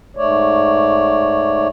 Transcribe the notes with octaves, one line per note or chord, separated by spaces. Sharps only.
G#2 A3 C#5 D5